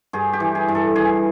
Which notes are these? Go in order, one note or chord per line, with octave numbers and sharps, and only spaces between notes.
G2 G#4
G4
E3
G#4
G2
A4
E3 G#4